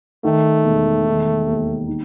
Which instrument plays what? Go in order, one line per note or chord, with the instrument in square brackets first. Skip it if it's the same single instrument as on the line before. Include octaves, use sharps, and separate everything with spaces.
[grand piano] D#3 [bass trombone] A3
[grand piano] E1
D#3
D#2
D#4